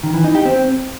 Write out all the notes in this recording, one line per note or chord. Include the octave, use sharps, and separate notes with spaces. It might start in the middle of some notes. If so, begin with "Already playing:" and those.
D#3
E3
D#4
G4
C4